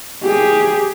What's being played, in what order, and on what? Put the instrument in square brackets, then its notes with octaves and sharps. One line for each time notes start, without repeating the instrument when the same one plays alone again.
[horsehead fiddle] G4 G#4